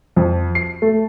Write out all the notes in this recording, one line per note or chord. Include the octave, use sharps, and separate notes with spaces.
F2
C7
A3